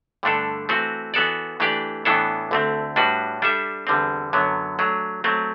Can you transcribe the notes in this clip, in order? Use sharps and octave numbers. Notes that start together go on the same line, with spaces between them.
G2 D3 A3 D4 A4
E3 A3 C4 F#4
E3 B3 F#4 A4 D5
E3 A3 D4 G4 D5
A2 E3 B3 D4 A4
D2 D3 A3 C4
A2 G3 D4 F#4 B4
G3 D4 A4 E5
E2 D3 G3 C4
F#2 D3 F#3 B3
F#3 A3 D4
F#3 A3 C4